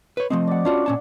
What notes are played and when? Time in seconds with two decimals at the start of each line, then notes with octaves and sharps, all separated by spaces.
0.17 B4 C#5
0.30 F3 A3 C4 D#5
0.47 D5 F#5
0.65 C#4 D4 F4 F#4
0.86 A#2 C#4 A5